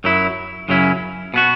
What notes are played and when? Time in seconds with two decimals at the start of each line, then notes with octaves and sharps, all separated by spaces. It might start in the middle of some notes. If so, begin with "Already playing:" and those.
0.04 F#2 F#3 E4
0.68 F#2 C#3 F#3 C#4 E4
1.34 B2 B3 F#4